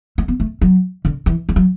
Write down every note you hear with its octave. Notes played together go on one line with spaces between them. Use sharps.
A3
B3
A3
F#3
D3
E3
G3
F#3